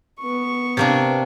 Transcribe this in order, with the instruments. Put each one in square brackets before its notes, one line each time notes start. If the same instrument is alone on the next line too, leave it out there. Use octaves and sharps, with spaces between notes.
[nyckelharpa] B3 C#6
[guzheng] C3 A#3 D4